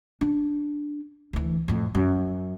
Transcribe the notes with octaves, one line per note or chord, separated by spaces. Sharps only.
D4
D2 E3
F2 A2
F#2